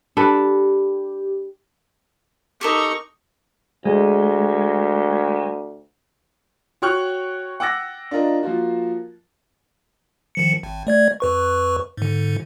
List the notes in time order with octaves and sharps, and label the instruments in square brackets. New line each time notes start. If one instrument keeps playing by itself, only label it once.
[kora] D4 A4 B4 [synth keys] G4
[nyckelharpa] D#4 C#6 [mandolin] G4 A4 A#4
[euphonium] D2 [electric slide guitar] G#3
[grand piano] F#4 C#5 G5 C#6 F6 F#6
F#5 G5 D6 E6 A6 A#6
D4 F4 A#4 D#5
F3 A#3 F4 F#4
[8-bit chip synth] D#3 F3 C#7
G#1
A3 D5 G#6
F2 B4 C#6
G#2 D3